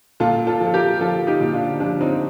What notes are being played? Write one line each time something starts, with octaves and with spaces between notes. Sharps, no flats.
A#2 F4 A4
F4 A4
F3
A4
G4 A#4
F3 F4 A4
D#4 G4
A#2
D4 F4
F3 D4
C4 D#4